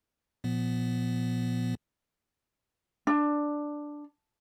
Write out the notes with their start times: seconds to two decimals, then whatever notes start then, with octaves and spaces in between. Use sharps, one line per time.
0.44 A#2 F3 B3
3.07 D4